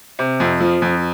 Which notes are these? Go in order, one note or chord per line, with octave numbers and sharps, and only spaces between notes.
C3
F2
F3
F2